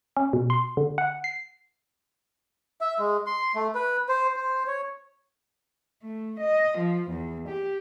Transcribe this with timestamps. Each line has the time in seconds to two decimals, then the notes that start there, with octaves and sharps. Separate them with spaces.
0.17 C#4
0.33 B2
0.50 C6
0.77 D3
0.98 F#5
1.24 C7
2.81 E5
2.99 G#3
3.26 C6
3.55 A3
3.75 B4
4.09 C5
4.36 C5
4.67 C#5
6.03 A3
6.40 D#5
6.78 F3
7.11 E2
7.49 G4